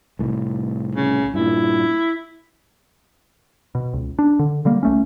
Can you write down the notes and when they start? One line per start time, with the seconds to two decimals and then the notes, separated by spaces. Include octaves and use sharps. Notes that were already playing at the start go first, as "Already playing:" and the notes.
0.19 C2 A2
0.95 C#3
1.34 G2 A#2 E4
3.75 B2
3.93 C#2
4.19 D4
4.39 D3
4.65 D3 G3 A#3
4.83 C2 A3 C#4